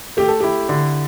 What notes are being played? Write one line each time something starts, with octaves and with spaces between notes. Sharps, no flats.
A3 G4
A4
E4 G4
D3